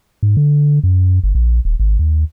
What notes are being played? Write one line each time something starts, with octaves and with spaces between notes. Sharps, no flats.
G#2
D3
F#2
G1
A#1
D#1
G#1
D#2